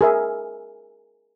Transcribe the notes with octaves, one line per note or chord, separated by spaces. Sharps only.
G#4 A#4 E5